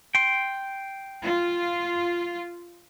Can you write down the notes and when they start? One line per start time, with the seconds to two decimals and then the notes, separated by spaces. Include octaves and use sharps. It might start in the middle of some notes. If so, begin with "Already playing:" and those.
0.15 G5 C6
1.24 F4